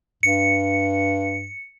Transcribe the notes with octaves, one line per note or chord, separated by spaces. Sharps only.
G2 C#7